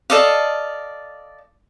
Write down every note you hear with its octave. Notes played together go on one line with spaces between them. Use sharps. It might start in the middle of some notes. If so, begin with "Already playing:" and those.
A4 D5 D#5 F5